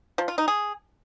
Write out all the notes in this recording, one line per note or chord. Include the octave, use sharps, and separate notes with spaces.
F3
F4
D#4
G#4